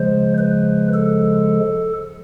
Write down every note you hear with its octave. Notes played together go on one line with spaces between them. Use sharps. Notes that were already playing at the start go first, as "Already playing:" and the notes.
Already playing: C#3 F3 G#3 C5
B4
A4